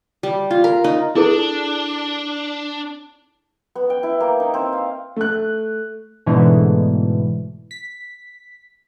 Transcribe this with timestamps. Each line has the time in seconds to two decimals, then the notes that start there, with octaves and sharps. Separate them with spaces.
0.23 G3
0.51 F4
0.64 A#4
0.84 D#4
1.15 D4 E4 G#4 A4
3.75 B3
3.90 G5
4.03 E4
4.20 A#3
4.40 D#4
4.54 C4
4.73 F5
5.16 A3 F#6
6.26 G#2 B2 D3 E3 G#3 A3
7.71 B6